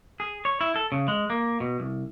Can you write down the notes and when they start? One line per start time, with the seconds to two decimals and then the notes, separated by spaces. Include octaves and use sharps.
0.20 G#4
0.45 C#5
0.61 E4
0.76 A4
0.92 C#3
1.08 G#3
1.30 A#3
1.60 B2
1.80 C2